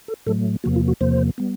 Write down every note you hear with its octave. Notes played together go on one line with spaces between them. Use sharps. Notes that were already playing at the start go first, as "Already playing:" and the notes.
A4
A2 F#3 A3 A4
E2 C3 F3 A#3 F#4
F4
F#4
E2 C3 F3 A#3 C5
G3 B3